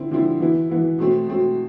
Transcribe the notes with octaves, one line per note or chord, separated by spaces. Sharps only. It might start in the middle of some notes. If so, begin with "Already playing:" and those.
Already playing: D3 F3 C4 E4
D3 F3 C4 E4
E3 B3 E4
E3 B3 E4
B2 A3 C4
B2 A3 C4